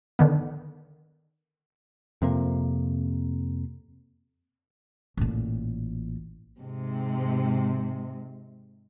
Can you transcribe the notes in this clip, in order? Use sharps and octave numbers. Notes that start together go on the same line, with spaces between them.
D3 D#3 B3
F2 C3 A#3
A1 A#2
G#2 C3 G#3